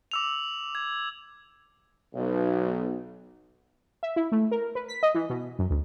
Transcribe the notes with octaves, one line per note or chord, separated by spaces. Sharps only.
D6 E6 F7
G#6
B1
E5
E4
A3
A#4
B4
B6
D#5
E3
B2
F#2
D2